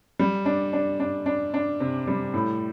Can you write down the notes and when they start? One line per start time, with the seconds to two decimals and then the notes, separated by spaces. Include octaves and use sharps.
0.19 G3
0.46 D4
0.73 D4
1.00 D4
1.26 D4
1.54 D4
1.80 C3
2.08 G3
2.34 A2